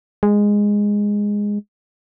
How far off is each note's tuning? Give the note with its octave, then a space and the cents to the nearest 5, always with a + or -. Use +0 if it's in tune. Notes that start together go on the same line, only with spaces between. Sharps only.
G#3 -10